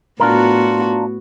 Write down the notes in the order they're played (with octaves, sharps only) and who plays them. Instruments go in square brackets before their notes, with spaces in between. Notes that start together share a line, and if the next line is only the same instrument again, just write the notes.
[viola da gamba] A2 B3 F#4 [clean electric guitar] D4 F4 A#4